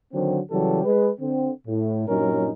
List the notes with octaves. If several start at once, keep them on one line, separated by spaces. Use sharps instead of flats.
D3 D#3 F#3 C4
C#3 E3 F#3 G3 G4 A4
G#3 B4
D3 C4
A2
G2 A#2 F#3 C#4 D#4 A#4